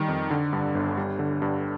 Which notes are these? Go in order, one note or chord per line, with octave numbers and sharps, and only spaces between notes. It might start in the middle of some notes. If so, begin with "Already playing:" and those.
Already playing: D#3 G3
F2
D3
G2
G1
G3
D3
G2